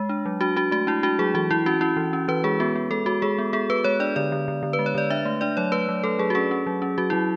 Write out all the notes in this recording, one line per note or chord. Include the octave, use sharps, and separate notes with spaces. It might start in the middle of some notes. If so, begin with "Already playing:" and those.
Already playing: G#3
D4
F#3
D4 F#4
D4 F#4
A3 F#4
D4 E4
D4 F#4
F#3 G#4
E3 F#4
E3 E4
C#4 F#4
C#4 E4
E3
C#4
E3 B4
G#3 G#4
B3 F#4
B3
G#3 A4
G#3 F#4
G#3 G#4
B3
B3 G#4
B3 B4
G#3 C#5
D4 D5
D3 D5
D3
D3
D3
B4
G#3
C#5
D3 D5
D4 E5
A3
D4 D5
F#3 C#5
A3 B4
F#3
A3 A4
F#3 G#4
F#4
C#4 G#4
C#4
F#3
C#4
F#3 F#4
F#3 E4